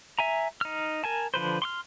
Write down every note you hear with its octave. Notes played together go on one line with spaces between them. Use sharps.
E5 G#5 A#5
D#4 F6
A#4 G#5 A5
D3 F3 B4 C5
C6 C#6 F6